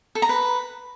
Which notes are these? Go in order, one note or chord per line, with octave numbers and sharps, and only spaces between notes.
A4
A#5
B4